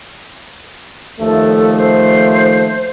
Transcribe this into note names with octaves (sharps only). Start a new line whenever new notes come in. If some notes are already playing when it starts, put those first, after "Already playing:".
D#2 F3 A3 A4
C5